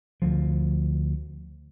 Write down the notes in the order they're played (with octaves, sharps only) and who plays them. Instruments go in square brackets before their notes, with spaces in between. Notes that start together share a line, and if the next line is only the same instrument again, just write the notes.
[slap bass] D2 F3